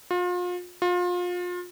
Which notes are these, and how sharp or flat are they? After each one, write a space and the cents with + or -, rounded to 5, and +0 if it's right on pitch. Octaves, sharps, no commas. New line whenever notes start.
F4 +35
F4 +30